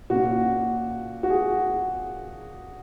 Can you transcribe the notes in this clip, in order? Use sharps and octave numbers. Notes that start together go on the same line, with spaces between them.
A#2 A#3 C#4 F#4
F#4
G#4